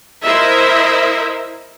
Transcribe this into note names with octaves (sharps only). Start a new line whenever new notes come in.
E4 A#4 C5 D#5 E5